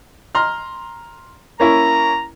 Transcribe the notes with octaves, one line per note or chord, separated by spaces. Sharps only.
A#5 C6 F6
A#3 C#4 E4 A#5